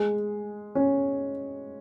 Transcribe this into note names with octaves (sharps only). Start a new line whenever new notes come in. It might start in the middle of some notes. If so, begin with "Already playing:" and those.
Already playing: G#3
C#4